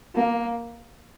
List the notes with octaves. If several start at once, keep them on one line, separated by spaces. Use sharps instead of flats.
A#3